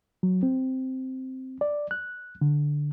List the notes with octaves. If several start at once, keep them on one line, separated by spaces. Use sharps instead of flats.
F#3
C4
D5
F#6
D3